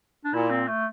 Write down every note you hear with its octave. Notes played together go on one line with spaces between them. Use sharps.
D4
A#2 E4
C4
A3